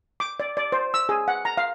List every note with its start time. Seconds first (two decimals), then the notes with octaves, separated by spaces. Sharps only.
0.20 D6
0.40 D5
0.57 D5
0.72 C5
0.94 E6
1.09 G#4
1.28 F#5
1.45 A#5
1.57 F5